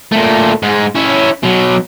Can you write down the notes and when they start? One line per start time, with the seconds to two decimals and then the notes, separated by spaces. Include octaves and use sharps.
0.12 A#2 A3
0.63 G#2 G#3
0.95 C#4 E4
1.43 B2 F#3